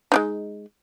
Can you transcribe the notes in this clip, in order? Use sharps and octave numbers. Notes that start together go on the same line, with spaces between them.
G#3 D4 D#4